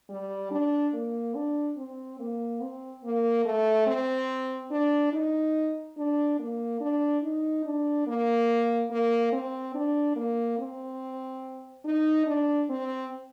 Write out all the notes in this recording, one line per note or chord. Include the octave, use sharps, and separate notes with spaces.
G3
D4
A#3
D4
C4
A#3
C4
A#3
A3
C4
D4
D#4
D4
A#3
D4
D#4
D4
A#3
A#3
C4
D4
A#3
C4
D#4
D4
C4